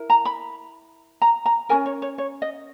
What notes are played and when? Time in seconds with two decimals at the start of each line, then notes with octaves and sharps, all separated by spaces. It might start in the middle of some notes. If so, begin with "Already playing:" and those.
Already playing: E4 A#4
0.10 A#5
0.25 B5
1.22 A#5
1.46 A#5
1.69 C#4 F#4 A#4 G#5
1.86 C#5
2.02 C#5
2.18 C#5
2.42 D#5